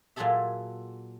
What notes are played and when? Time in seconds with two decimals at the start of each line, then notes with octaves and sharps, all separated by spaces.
0.16 A#2 F#3 F4 G#4 A4 E5